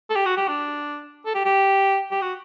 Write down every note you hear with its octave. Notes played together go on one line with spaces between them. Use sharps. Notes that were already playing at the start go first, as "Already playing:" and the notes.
A4
G4
F#4
G4
D4
A4
G4
G4
G4
F#4